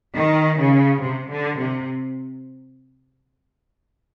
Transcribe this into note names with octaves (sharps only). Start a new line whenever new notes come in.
D#3
C#3
C3
D3
C3